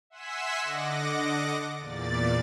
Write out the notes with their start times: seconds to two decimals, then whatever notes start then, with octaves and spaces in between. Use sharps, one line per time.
0.10 E5 F#5 G#5 C6 E6 B6
0.61 D3 D#5 F#5 D6 A#6
1.79 E2 A#2 D5 A6